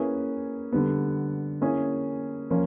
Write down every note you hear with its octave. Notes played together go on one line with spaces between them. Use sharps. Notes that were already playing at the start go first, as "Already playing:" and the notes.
Already playing: A#3 C#4 E4 G#4 B4
D3 G3 B3
A#3 C#4 E4 G#4
F3 A#3 C#4